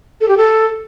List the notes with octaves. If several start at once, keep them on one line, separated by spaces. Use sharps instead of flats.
A4
G4
A4